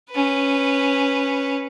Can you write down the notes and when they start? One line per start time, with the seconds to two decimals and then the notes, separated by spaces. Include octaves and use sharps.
0.11 C#4 B4